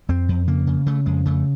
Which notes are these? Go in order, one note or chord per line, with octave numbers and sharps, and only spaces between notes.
F2 C4
F2
C#3 A#3
C#3
C#3 A3
F2 G#3
C#3 A3